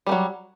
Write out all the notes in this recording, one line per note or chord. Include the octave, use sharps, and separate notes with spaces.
F#3 G3 A3